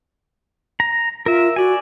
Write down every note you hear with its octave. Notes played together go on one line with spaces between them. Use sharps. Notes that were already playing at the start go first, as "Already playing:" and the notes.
A#5
F4 A#4 E5
F#4 D5 G#5